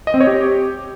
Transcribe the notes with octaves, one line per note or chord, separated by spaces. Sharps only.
D#5
C4
C#5
G4